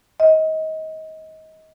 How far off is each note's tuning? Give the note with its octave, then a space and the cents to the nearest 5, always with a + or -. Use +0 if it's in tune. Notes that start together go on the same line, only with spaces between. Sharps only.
D#5 +25